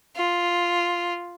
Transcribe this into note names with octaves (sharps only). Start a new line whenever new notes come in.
F4